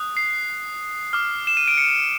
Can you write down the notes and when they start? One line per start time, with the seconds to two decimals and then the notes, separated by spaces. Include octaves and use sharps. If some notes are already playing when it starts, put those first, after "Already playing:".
Already playing: D#6 F#6
0.17 C7
1.13 D6 F6
1.47 E7
1.57 D#7
1.68 D7
1.78 C#7